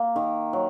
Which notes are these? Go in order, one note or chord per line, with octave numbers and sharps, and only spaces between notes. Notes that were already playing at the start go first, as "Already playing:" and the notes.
Already playing: A#3
D#3
F#3